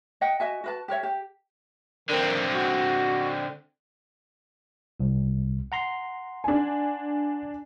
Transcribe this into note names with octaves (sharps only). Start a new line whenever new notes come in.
D#5 E5 F#5 G5
F#4 D#5 E5 G#5
F#4 B4 A5
G4 A#4 C#5 E5
G4
D3 D#3 C4
F#4
C2
F#5 A#5 C6
D4 G#5